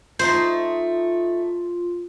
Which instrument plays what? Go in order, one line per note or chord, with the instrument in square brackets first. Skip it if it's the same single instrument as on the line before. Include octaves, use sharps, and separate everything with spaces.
[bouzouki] A3 D#4 A5 [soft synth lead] F4 [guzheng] C5